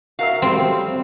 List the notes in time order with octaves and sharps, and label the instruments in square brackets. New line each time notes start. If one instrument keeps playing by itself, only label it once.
[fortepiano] F#4 A#4 E5 [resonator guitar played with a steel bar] F5
[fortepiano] F#3 G3 [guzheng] C4